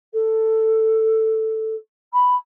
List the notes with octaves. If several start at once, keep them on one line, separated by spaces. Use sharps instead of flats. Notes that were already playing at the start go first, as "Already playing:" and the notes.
A4
B5